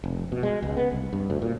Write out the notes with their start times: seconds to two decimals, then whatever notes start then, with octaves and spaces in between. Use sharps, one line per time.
0.04 F1
0.32 B2
0.43 G#3
0.62 C#2
0.77 B3
0.92 C2
1.13 G2
1.30 D2
1.42 A#2